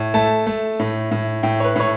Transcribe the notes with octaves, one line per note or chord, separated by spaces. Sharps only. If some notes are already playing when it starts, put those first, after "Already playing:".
Already playing: A2
A3 A5
A3
A2
A2
A2 G5
C#5
B4
A2 C#5